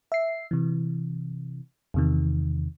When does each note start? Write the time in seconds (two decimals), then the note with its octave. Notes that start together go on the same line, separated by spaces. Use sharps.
0.12 E5 C7
0.51 C3 E3
1.94 E2 C3 D#3